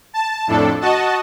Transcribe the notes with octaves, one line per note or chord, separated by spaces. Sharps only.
A5
F2 A2 D4 A4
F#4 D#5 A5